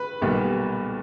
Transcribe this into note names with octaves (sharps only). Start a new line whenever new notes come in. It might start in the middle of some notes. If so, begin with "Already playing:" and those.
Already playing: B4 B5
B1 A#2 G3 B3